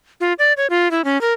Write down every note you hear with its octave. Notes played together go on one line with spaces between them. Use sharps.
F4
D5
C#5
F4
E4
C#4
A#4